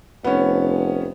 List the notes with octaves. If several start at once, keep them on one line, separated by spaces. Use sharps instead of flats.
F1 B3 C#4